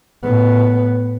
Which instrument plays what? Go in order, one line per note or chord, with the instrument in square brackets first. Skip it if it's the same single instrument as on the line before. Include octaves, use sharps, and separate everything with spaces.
[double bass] A2 B3